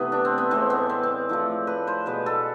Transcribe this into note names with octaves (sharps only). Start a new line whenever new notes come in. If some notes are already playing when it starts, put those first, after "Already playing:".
Already playing: C3 E3 A3 B3 E4
D4
C4
B3
A2 E3 G#3 C4
B3
C4
C4
A2 F3 A3
B4
C5
B2 G#3 B4
A4